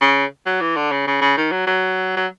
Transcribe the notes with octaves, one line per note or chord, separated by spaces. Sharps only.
C#3
F#3
E3
D3
C#3
C#3
C#3
D#3
F#3
F#3
F#3